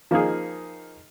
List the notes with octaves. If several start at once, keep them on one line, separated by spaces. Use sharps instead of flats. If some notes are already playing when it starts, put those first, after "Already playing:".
F3 A#3 D#4 G#4